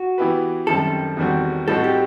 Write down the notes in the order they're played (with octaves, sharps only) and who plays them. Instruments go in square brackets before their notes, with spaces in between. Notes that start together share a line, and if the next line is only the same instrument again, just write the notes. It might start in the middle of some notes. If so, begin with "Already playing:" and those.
Already playing: [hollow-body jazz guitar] F#4
[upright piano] E3 B3 E4 G4 B4
[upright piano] F#2 D#3 G3 C4 [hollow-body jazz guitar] A4
[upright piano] E2 D#3 G3 C4 F#4
[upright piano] A2 G3 C4 D#4 F#4 [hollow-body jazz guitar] A4
[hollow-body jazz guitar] G4